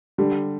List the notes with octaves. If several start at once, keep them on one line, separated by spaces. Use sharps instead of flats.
D3 G3